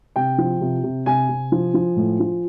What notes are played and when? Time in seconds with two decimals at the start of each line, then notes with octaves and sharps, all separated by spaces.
0.16 C3 G5
0.38 F3
0.61 C3
0.83 C3
1.06 C3 G#5
1.29 C3
1.52 F3
1.74 F3
1.96 A2
2.20 F3